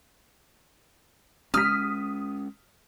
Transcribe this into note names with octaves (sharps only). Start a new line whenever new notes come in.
G#3 C#4 D#6 F6 B6